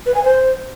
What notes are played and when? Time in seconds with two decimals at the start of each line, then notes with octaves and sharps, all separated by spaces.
0.06 B4
0.14 G#5
0.23 C5